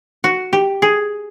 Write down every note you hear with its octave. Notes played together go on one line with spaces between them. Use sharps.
F#4
G4
G#4